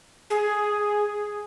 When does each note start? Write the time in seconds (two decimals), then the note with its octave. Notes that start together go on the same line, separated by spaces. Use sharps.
0.30 G#4